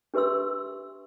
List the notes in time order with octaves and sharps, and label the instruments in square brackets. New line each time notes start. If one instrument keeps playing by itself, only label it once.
[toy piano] D4 G4 B4 E5 C6 E6